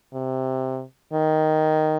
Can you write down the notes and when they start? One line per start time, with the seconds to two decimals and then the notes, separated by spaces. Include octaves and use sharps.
0.13 C3
1.13 D#3